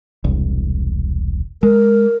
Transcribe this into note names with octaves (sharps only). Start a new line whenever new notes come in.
E1 C2
G#3 A#4